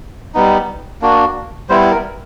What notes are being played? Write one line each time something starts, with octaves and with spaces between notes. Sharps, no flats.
G3 B3 D#4
A#3 D4 F#4
G3 B3 E4 C5
A#4